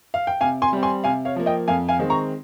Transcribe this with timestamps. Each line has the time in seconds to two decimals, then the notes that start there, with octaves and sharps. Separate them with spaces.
0.14 F5
0.27 G5
0.41 C3 F5 G#5
0.62 G#5 C6
0.73 G3 C4
0.83 G#5 C6
1.04 C3 F5 G#5
1.25 C#5 F5
1.36 F3 A#3
1.46 D#5 G5
1.68 F2 F5 G#5
1.89 F5 G#5
1.99 D#3 G#3 C4
2.10 A#5 C#6